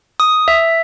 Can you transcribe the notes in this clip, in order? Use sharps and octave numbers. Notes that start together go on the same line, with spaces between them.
D#6
E5